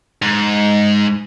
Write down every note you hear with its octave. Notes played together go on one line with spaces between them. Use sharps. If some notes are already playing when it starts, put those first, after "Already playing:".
G#2